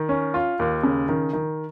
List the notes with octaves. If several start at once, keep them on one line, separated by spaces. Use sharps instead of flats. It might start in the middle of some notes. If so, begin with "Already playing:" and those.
Already playing: D#3
C#4
F4
D#2
C#3
D#3
D#3